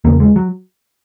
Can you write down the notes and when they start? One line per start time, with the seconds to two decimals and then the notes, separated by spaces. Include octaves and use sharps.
0.05 E2 C#3 A#3
0.20 G#3
0.36 F#3